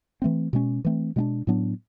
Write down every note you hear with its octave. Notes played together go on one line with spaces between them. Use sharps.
E3 A3 C4
B2 G#3 C#4
E3 A3 C4
B2 G#3 B3 D4
A2 F#3 B3 D4